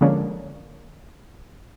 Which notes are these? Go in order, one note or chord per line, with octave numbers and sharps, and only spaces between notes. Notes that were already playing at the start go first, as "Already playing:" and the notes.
D3 F3 G#3 A#3 C#4 D4